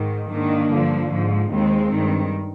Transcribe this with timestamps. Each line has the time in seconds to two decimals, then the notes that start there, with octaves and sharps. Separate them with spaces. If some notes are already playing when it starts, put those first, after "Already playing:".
Already playing: G#2 D#3
0.29 G#2 D#3 A#3 D4
0.69 G2 D3 F3
1.10 G#2 F3
1.49 D#2 D#3 G#3 C4
1.91 G2 D#3